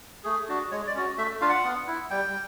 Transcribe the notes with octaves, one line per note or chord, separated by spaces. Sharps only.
A3 G#4
D4 F#4
G#3 C#5
D5
C#4 F#4
A3 E5
D4 F4 F5
F#5
B3
E4
G3 G5